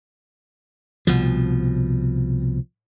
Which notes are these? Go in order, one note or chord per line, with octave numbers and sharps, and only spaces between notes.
C2 B2 F3